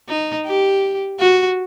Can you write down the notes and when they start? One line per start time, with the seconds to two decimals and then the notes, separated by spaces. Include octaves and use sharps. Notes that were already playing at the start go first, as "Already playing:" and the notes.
0.08 D#4
0.46 G4
1.20 F#4